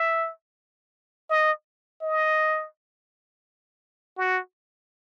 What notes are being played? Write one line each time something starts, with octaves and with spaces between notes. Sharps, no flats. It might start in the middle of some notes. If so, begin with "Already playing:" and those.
Already playing: E5
D#5
D#5
F#4